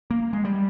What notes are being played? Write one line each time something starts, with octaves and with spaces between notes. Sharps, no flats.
A#3
G#3
G3